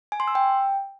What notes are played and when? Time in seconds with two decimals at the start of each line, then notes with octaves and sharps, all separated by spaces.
0.12 G#5
0.20 C6
0.28 E6
0.35 G5